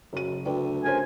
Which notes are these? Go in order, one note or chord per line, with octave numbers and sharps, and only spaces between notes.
F#1 F#2 D#7
D2 B4 D5 G5
C#4 A#4 C5 G#5